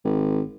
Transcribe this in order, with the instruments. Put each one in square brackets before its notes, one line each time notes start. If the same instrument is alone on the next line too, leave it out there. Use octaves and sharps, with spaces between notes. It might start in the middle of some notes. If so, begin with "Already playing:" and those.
[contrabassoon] G#1